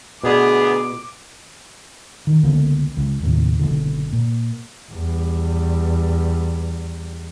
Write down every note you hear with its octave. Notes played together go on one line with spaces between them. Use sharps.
D2 B2 B3 G#4 D5 D6
D#3
C#2 D3 A#3 B3
C#2
D#2 A2 C3
F#1 C2 B2 D3
A#2
E2 G3